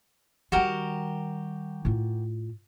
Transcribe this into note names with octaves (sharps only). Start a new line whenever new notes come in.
D#3 G3 F#4 G4 A#4
A2 F4